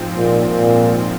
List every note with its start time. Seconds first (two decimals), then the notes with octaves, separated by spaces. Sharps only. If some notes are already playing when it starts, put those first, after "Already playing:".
Already playing: G#2 F3 C4
0.16 A#2
0.47 A#2